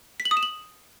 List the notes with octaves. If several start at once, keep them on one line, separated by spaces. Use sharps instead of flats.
B6
F#7
D#6
E7
F#7